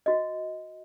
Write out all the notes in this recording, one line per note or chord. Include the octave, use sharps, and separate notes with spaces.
F#4 D#5